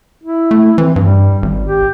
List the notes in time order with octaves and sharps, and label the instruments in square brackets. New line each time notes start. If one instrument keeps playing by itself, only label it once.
[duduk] E4
[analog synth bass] A3
[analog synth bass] E3 [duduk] C4
[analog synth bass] G2 [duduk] G3
[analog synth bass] G#1
[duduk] G4